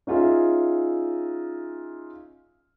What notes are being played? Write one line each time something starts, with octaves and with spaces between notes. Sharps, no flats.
C#4 D#4 F4 G#4 E5